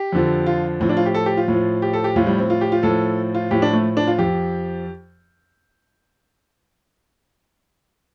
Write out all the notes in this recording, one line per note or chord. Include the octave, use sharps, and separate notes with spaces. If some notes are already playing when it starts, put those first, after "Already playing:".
Already playing: G4
F2 D3 F3
F4
A2 F3 C4
D4
F4
G4
A4
G4
F4
A2
F3
G4
A4
G4
A2 F3 F4
G3
C4
F4
G4
F4
A2 F3 A4
F4
A2 F3 G4
D4
A3
D4
F4
F2 F3 G4